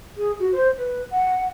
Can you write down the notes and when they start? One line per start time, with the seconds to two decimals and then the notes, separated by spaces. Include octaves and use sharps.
0.17 G#4
0.39 F#4
0.52 C5
0.77 B4
1.10 F#5